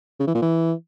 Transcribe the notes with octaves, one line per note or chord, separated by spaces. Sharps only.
C#3
E3
A#2
E3